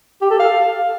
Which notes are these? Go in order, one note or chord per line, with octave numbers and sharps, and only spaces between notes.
G4
A4
F5